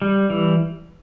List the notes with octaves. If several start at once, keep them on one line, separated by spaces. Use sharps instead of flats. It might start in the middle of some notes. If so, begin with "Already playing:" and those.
G3
E3